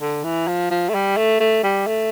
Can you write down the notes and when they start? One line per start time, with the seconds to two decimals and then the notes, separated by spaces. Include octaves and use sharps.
0.01 D3
0.24 E3
0.48 F3
0.70 F3
0.89 A3
0.94 G3
1.17 A3
1.40 A3
1.63 G3
1.87 A3